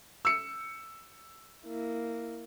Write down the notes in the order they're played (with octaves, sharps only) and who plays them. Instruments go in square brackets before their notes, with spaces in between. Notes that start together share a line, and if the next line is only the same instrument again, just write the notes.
[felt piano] E6 C#7
[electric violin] A#3 E4